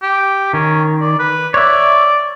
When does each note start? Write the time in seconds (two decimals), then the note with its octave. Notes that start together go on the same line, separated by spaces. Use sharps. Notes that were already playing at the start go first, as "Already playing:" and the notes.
0.02 G4
0.53 D#3 C#4
1.01 D5
1.19 B4
1.54 C#5 D5 E5